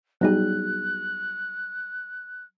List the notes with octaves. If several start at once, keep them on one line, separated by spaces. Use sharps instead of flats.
F#3 G3 B3 D#4 G#4 F#6